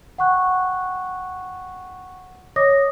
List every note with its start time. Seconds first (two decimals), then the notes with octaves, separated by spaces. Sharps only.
0.18 F#5 G5 C#6 F#6
2.56 C#5 D#5 D6 D#6 A#6